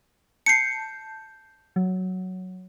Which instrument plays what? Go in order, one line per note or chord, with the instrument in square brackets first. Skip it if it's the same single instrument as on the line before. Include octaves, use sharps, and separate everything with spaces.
[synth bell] A5 G6 [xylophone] C7 C#7
[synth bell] F#3